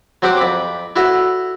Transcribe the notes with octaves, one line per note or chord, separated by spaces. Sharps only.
F#3 C4 G4 F#5 D6
F2 B5 D6
E4 F#4 A4 C#5